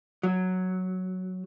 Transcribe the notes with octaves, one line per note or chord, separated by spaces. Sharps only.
F#3